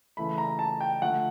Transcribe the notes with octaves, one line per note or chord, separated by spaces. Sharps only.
C#3 E3 A3 B5
A#5
A5
G5
D3 F3 A3 F#5